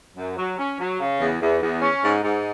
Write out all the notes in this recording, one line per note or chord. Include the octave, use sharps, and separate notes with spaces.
F#2
F#3
C#4
F#3
C#3
E2
E2
E2
C#4
G#2
G#2